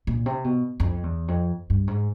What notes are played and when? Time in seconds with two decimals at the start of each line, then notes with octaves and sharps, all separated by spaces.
0.07 A#2
0.26 C3
0.44 B2
0.80 F2
1.03 E2
1.28 F2
1.70 G2
1.87 G#2